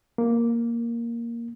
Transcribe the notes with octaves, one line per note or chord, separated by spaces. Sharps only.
A#3